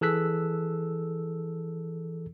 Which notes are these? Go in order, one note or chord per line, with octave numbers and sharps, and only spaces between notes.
E3 G#4 A4 E6 F#6 B6